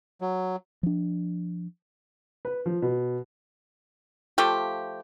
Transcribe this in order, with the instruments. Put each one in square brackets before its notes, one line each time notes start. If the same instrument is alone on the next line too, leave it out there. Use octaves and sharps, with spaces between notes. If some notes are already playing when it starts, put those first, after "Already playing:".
[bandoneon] F#3
[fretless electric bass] F3 D4
[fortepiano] B4
F3
B2
[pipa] F3 A3 F4 G4